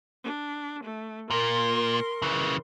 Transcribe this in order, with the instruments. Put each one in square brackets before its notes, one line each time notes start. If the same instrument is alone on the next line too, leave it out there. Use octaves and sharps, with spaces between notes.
[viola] D4
A3
[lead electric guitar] A#2 [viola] A#4 C6
[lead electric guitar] C#3 E3